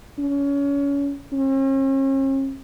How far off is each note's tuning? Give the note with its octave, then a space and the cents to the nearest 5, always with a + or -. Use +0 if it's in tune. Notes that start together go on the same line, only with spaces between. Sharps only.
C#4 +25
C#4 -45